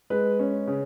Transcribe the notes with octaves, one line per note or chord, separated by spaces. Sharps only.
G#3 B4
C#4
C#3